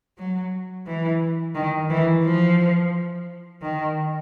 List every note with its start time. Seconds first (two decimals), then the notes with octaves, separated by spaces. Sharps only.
0.18 F#3
0.87 E3
1.55 D#3
1.90 E3
2.24 F3
3.62 D#3